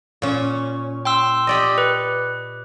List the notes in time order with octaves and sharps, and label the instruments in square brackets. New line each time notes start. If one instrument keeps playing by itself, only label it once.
[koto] A#2 C#4
[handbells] G5 C6 E6
[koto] G4 D5 D#5
[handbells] B4